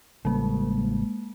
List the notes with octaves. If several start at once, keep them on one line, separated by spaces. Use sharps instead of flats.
A1 C#3 G3 G#3 A#3